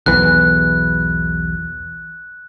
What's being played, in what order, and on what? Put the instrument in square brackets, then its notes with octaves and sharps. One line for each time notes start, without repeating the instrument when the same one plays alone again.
[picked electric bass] B1 E2 E3 [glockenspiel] F#6